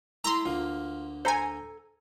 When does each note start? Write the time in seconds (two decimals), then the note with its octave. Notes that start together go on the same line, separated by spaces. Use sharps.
0.24 A3 E4 A4 A#5 C6
0.45 D2 D3 A#3 F4
1.25 A4 C5 G#5 A#5